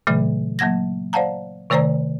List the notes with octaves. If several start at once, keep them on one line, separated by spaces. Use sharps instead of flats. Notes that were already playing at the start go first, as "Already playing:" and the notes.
A#2 C#3 E3 F#3 A3
F#3 A#3 F#5 G#6 A#6
C5 D5 F5 F#5 A5 A#5
C3 D#3 A3 C5 D5 A#5